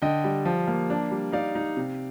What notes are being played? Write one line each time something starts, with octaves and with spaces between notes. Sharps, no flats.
D3 D#5 G5
G3
F3
A#3
D4
G3
D#4 D5 F5
D#4
C3